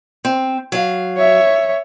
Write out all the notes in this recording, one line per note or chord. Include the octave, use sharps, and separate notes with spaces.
C4
F#3 F5
C#5 E5